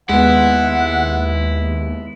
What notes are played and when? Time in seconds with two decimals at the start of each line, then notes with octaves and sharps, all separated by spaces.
0.09 D#2 G#3 B3 E4 F#5